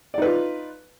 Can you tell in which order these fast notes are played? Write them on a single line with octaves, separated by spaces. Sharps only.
D5 D#4 B4 F4